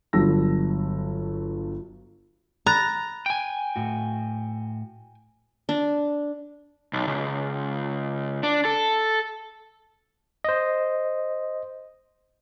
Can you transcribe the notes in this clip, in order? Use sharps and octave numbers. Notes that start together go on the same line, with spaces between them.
G1 G2 F#3 A5 E6 A#6
A#5 B5 F#6 A6
G5 G#5
A2 F#4
D4
B1
C#2
D4
A4
C5 D#5